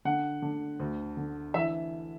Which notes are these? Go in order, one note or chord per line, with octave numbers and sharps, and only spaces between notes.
D3 F#5
D3
D2
D3
E3 E5